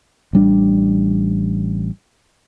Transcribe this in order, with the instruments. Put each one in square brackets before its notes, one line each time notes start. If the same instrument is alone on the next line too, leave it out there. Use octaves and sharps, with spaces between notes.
[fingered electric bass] A1 G3 D4